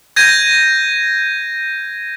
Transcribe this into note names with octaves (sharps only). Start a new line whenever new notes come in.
G6 G#6 A#6 D#7